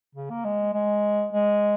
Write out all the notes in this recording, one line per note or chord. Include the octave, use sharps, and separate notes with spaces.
C#3
A#3
G#3
G#3
G#3